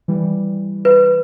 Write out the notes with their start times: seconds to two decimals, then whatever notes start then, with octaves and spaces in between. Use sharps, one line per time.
0.08 E3 G3
0.85 B4